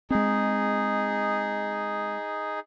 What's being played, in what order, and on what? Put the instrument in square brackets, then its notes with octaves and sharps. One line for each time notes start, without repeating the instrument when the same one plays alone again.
[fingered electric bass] G#3 C4 [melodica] D#4 G#4